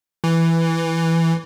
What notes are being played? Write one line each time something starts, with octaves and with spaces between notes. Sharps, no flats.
E3